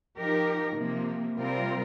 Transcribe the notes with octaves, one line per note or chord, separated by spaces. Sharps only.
F3 D#4 G4 A#4
C3 F3 A#3
C3 G3 C4 F4 A#4